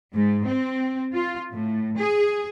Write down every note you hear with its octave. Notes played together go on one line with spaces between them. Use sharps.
G#2
C4
F4
A2
G#4